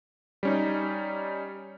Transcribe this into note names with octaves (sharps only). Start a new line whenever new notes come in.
G3 C#4 D#4